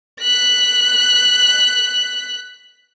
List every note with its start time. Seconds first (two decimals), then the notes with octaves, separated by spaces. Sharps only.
0.21 F#6 B6